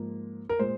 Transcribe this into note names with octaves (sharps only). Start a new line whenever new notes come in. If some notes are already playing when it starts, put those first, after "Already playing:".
Already playing: G#2 F3 A#3
A#4
A#2 G#3 C5